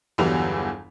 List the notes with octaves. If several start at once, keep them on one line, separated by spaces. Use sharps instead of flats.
G1 E2 E3 F#3 G3 F7